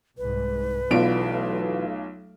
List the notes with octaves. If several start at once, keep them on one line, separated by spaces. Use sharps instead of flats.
C2 G#2 B4
B1 B2 E3 F#3 A3 F4 D5 D7